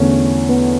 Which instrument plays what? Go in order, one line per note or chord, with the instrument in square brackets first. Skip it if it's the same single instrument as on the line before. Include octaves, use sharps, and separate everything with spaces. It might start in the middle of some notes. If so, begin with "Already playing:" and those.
Already playing: [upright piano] E2 D3 A3 C#4
B3